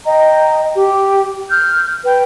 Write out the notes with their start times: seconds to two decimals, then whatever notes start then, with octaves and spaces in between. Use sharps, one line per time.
0.06 D#5 G5 A#5
0.75 G4
1.50 F6 G6
2.04 B4 G5